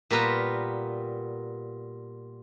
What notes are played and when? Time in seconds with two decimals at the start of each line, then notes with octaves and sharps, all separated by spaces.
0.11 A#2 G3 B3 A#4 B4 F5